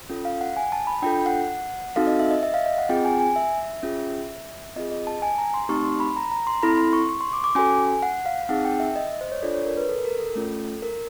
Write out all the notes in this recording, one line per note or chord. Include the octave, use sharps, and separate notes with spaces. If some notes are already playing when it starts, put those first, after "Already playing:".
C#4 F4 A4
F5
F#5
G#5
A5
B5
D4 F4 A4 G5
F#5
C4 D#4 F#4 A4 F5
D#5
E5
D#5
E5
F5
D#5
F#5
C4 F4 G#4 G5
G#5
G#5
E5
C#4 F4 G#4
C4 F4 G#4 D#5
D#5
A5
G#5
A#5
C6
A3 C4 D#4 G4 C#6
C6
B5
A#5
A#5
C6
C4 E4 A4 B5
C6
C#6
C#6
C6
D6
D6
C#4 F#4 A4 G#5
F#5
F5
C4 D#4 G#4 F#5
G5
E5
D#5
C5
C#5
D4 F4 A4 D5
C#5
A#4
B4
A4
A#4
A4
A3 C#4 F4
A#4